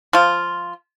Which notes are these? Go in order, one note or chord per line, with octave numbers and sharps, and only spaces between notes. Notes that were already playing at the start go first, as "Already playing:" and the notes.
F3 F4